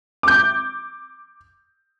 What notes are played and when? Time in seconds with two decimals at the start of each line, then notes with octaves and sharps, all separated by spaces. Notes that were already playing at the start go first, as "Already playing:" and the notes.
0.23 D6 G6